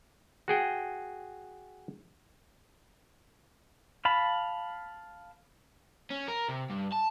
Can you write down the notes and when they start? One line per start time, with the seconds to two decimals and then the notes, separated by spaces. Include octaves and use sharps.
0.48 F#4 G#4 G5
4.05 F5 A5 B5
6.10 C#4
6.28 A#4
6.49 C3
6.70 G2
6.92 A5